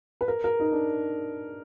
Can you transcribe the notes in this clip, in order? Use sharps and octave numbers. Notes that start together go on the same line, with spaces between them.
B4
A#4
A#4
D#4
D4